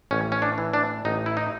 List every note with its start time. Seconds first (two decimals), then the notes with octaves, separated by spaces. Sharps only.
0.11 A1 C#4
0.32 C#4
0.42 D4
0.58 E3
0.73 D4
1.05 A1 D#4
1.26 E4
1.37 D#4